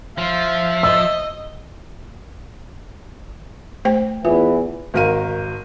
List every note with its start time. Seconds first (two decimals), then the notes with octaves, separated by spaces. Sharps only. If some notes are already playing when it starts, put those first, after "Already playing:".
0.18 F3 F4 E5
0.83 D#5 E6
3.85 A3 C5 G5
4.25 E2 E3 F4
4.94 G#1 F#4 A#4 F5 D#7